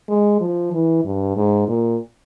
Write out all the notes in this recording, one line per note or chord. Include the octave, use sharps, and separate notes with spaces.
G#3
F3
E3
G2
G#2
A#2